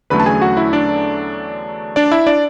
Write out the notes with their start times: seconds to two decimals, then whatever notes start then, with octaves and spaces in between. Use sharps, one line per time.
0.10 E2 D3 F#3 A3 C#4 B4 B5
0.20 A5
0.26 G#4 G#5
0.42 F#4 F#5
0.57 E4 E5
0.73 D4 D5
1.96 D4 D5
2.12 E4 E5
2.27 D4 D5